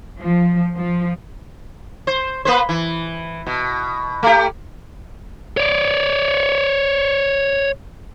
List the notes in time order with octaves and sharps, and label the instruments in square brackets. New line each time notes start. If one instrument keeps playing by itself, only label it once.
[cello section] F3
F3
[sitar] C5
A#3 B4 C5
E3
B2
A3 G4
[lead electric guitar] C#5 D5